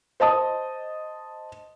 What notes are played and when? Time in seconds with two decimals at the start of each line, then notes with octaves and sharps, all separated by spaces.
0.20 C5 D#5 A5 D#6